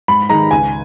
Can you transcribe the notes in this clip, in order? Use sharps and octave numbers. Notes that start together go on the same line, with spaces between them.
G#2 B5
D#3 G#3 D#4 A#5
C#2 G#5